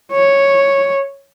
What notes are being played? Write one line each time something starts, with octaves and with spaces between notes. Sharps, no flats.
C#5